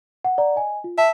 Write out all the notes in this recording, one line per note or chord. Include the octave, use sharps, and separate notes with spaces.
F#5
D5 F#5 A#5
D#5 G#5
F4
E5 A5